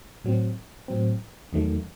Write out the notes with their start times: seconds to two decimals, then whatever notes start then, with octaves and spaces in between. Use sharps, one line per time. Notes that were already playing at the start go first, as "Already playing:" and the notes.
0.24 A2 F#3 C4
0.88 A2 F#3 C4
1.53 E2 D#3 F#3 A3